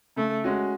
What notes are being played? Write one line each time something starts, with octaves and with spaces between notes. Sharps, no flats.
C#3 A3
G#3 C#4 F#4